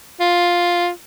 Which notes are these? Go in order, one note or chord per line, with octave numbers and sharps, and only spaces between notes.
F4